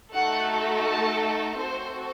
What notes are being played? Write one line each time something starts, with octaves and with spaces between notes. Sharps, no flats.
A3 D#4 F#4 A4 F#5
A5
C4 F#4 A4 C5